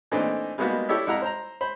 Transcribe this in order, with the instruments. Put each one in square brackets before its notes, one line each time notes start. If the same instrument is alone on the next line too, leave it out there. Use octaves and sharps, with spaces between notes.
[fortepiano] A#2 E3 A3 C4 D4 D#4
G3 G#3 A#3 B3 D#4 F#4
E4 G4 A4 C#5 D5 E5
F2 E4 F#5 A#5
C5 A#5
C5 B5